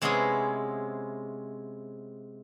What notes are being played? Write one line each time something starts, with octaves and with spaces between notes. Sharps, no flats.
C3 G#3 B3 C#4 E4 G#4